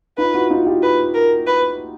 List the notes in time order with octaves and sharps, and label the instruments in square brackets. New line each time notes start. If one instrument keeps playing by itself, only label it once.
[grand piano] D#4 F4 [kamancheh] B4
[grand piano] E4 F#4
D#4 F4
F4 G4
[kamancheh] B4
A#4
B4